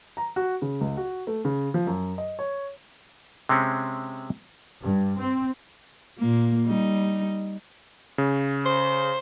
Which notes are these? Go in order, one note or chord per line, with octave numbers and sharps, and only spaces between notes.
A#5
F#4
C#3
C#2
F#4
A3
C#3
F3
F#2
D#5
C#5
C3 G#3 C4 C#4
G2
C4
A#2 A#3
G3 D#4
C#3
C5